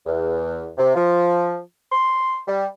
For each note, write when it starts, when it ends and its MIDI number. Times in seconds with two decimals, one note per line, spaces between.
0.06 0.70 40
0.78 0.92 48
0.94 1.58 53
1.92 2.38 84
2.48 2.67 55